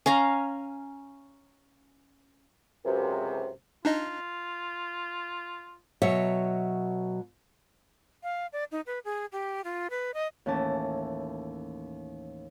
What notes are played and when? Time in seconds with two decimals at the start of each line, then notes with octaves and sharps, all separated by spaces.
0.06 C#4 F5 A#5
2.85 C#2 F#2 C3
3.85 D4 D#4 F4 D#5
6.02 B2 F#3 C#5 E5
8.23 F5
8.53 D5
8.72 D#4
8.87 B4
9.05 G#4
9.32 G4
9.64 F4
9.90 B4
10.14 D#5
10.46 D#2 A2 E3 C#4 A5